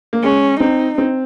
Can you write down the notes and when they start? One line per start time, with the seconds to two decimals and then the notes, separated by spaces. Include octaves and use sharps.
0.13 A#3
0.23 G#3 C#4
0.60 C4 D#4
0.98 C4